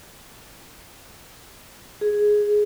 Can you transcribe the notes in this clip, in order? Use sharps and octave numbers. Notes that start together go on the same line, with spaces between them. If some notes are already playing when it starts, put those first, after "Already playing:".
G#4